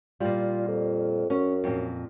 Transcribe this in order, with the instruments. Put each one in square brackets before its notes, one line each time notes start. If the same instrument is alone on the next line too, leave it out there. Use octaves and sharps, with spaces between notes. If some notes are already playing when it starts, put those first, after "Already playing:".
[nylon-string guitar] A#2 G3 [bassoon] F4
[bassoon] F2
[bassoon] F#2 [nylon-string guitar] C#4
[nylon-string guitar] F2 A#2